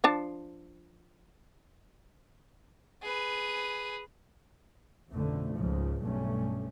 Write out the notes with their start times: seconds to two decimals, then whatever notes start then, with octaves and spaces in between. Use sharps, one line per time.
0.04 F3 D4 A5
3.03 G#4 B4
5.10 A1 F2 B2 D3 A3
5.55 C#2 G#2 C#3 F3
6.00 B1 G2 A3 C#4